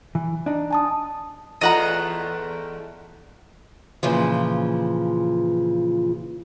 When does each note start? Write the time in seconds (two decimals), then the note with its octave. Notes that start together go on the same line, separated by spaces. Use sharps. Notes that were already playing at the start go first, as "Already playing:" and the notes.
0.15 E3
0.46 D4 D#4
0.71 G#5 A5 D#6
1.61 E2 A3 F4 D#5 F#5 A#5
4.03 A#2 C#3 E3 F3